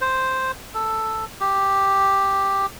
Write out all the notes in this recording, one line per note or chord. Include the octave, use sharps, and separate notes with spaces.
C5
A4
G4